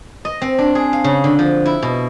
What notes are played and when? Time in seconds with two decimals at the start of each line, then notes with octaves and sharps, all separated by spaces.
0.25 D#5
0.41 C4
0.58 D4
0.75 G#4
0.93 F5
1.04 C#3
1.24 D3
1.39 F3
1.66 E4
1.82 B2